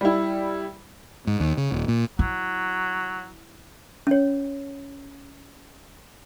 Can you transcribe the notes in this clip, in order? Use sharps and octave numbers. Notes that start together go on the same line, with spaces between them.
G3 E4
G#2
D#2
C#3
D#1
A#2
F#3 E4
C#4 C#5